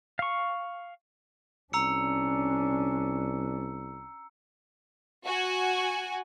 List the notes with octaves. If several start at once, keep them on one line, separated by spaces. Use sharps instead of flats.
F5 C#6
C2 C#4 D4 A#5 E6 C#7
F#4 G#5